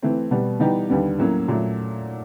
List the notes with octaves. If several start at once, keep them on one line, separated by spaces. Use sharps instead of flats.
E3 A3 C4
B2 G3 B3
E3 G3 B3 D#4 G4
D#2 D3 G3 B3
A2 F#3 A#3 C#4
A#2 F#3 A3